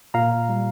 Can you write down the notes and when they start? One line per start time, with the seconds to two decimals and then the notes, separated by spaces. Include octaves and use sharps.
0.14 A#2 F5 A#5
0.49 G3